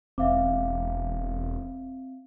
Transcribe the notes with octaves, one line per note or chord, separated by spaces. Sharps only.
E1 C4 E5 F5 D6